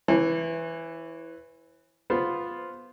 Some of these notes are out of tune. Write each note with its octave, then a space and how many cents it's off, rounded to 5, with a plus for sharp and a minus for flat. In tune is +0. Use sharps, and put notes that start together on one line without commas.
E3 +0 C#5 -45
B3 +0 F4 +0 C5 +0